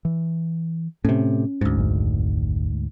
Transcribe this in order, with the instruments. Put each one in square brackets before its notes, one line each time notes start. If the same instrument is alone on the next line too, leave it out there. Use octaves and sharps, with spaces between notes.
[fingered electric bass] E3
[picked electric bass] A2 C3 [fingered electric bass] C#4
[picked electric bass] D2 G#2
[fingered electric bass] G#1 F2 G#3